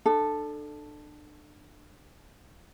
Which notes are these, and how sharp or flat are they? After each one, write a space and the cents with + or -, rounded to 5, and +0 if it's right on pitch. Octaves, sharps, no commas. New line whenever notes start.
D4 +30 A4 +0